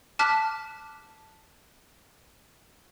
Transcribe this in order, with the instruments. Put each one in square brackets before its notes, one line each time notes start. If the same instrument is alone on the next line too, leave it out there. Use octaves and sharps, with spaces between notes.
[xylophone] A5 D6 F6 F#6 B6